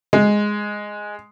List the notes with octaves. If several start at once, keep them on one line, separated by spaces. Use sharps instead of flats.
G#3